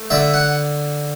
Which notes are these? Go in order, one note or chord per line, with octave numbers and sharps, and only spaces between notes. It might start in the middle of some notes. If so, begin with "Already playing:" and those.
Already playing: A3
D3 E5
F#5